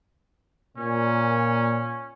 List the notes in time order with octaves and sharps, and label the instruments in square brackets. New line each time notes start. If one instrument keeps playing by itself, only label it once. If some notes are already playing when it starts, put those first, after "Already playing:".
[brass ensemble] A#2 [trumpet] C#4